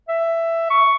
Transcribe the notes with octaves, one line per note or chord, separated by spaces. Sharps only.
E5
C#6